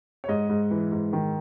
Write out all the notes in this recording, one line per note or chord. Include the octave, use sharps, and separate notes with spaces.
C#5
G#2 D#5
G#2
E3
G#2
D#3